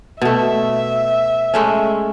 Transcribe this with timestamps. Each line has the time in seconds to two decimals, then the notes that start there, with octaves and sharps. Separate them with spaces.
0.22 B2 A3 E5
1.54 G#3 A3 C#4